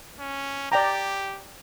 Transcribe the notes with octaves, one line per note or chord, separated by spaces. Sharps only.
C#4
G4 D5 G5 A#5